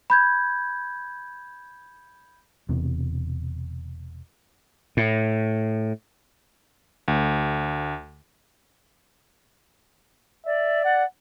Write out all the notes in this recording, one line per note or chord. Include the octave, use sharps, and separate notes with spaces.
B5 G6 G#6
E1 E2 C3
A2
D2
D5 E5
F#5